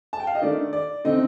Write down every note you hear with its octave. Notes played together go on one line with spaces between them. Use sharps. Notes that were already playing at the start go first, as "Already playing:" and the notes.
A5
G5
F5
D#5
D#3 A3 D4 D5
D5
D3 A3 C4 D#4 D#5